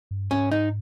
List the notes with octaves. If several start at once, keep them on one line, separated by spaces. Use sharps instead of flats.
G2
G#2 C#4
D#4